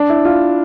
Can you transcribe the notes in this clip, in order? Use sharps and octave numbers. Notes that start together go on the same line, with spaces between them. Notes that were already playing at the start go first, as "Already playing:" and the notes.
Already playing: D4
E4
F4